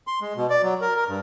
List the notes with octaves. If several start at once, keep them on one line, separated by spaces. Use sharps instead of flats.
C6
G#3
B2
D5
F#3
A#4
A#4
G2